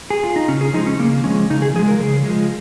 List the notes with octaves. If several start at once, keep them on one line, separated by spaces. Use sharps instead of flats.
G#4
F4
D#4
C#3 C#4
G#4
F3 G#3 D#4
C#4
C#3 A#3
F3 G#3 C#4
C#3 D#4
G#4
F3 G#3 G#4
A#4
C#3 G#4
F3 G#3